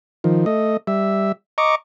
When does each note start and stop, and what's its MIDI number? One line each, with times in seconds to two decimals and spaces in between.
0.24 0.45 51
0.24 0.45 53
0.46 0.77 57
0.46 0.77 75
0.87 1.32 55
0.87 1.32 76
1.58 1.75 75
1.58 1.75 82
1.58 1.75 85
1.58 1.75 86